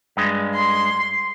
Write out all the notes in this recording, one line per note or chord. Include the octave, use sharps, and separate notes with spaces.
G2 G#3
C6